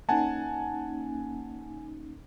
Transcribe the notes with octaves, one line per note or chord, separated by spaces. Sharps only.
A#3 C#4 D#4 F#5 G#5 A5